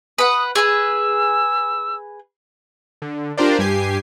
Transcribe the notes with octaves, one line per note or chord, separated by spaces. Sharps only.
B4 F#5 D#6
G#4 B4 E6
D3
D4 F4 G4 A#4 C5 D5
G2 G4 G#5 C7